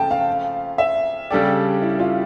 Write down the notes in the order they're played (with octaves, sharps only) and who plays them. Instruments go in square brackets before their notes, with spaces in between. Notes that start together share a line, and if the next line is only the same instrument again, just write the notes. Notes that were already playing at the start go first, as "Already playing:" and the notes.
Already playing: [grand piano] C#3 F3 A3 [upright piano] G5 A5
[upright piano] F5
E5
[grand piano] C#3 G3 D4 A4 D5 [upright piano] G4
[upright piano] E4
F4